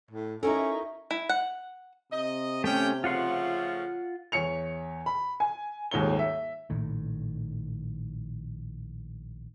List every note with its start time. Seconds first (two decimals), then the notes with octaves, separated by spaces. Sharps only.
0.11 A2
0.43 C#4 D#4 E4 F#4 A4 A#4 C#6
1.11 E4
1.29 F#5
2.13 C3 D#5
2.64 A3 C#4 G4 G5
3.04 C#3 F3 A3 F4 F#5 C6
4.32 E2 C#5 C#7 F7
5.06 B5
5.40 G#5
5.91 D#1 D#2 G#2 C#5 G7
6.19 E5
6.70 A#1 A2 D#3